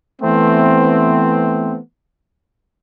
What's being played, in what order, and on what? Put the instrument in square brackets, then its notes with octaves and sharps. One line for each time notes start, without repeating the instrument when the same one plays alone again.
[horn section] E3 A3 B3 C4